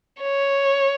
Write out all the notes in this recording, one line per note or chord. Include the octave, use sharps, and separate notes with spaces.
C#5